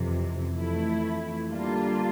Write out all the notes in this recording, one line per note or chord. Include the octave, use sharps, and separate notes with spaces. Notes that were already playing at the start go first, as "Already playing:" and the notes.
Already playing: F2 C3 E3
F2 E3 A3 E4
D3 G3 A#3 D4 F4